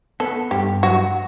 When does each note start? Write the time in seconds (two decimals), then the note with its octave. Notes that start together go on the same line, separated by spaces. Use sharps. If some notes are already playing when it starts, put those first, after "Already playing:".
0.20 B3 A4
0.51 G2 G4
0.83 F#3 F#4